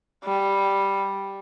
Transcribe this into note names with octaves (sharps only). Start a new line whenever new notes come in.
G3